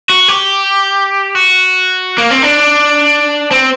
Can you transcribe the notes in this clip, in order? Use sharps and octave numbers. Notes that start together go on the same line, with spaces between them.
F#4
G4
F#4
A#3
C4
D4
C4